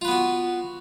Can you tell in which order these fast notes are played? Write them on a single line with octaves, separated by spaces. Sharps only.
F4 B4 B3 F#4